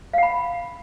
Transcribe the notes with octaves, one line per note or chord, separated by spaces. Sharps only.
F5 F#5 B5